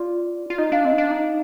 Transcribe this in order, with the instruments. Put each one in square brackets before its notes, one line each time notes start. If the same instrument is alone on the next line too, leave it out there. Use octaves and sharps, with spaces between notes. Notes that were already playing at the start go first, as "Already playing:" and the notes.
Already playing: [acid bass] F4 [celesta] D5
[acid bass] F4
[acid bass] D#4 [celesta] D#5
[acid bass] D4 [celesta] F5
[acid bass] C4 [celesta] D#5
[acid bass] D#4
D4
D#4